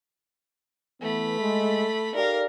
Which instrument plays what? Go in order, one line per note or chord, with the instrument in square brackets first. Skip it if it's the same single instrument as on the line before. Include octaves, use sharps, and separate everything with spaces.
[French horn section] E3 B3 [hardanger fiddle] A3 B5
[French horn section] G#3
[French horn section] D#4 G4 D5 [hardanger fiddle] A#4 F5